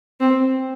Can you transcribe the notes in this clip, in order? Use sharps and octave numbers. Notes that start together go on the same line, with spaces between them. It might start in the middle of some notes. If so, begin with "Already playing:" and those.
C4